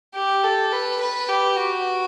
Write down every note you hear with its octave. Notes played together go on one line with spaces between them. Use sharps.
G4
A4
B4
B4
G4
F#4